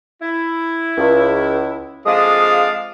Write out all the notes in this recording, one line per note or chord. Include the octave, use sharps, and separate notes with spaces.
E4
C#2
F2 G#3 D4 D5 F5 D#6